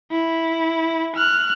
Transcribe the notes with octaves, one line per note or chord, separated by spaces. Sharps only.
E4
F6 F#6